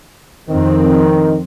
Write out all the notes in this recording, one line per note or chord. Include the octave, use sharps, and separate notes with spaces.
F2 D#3 C4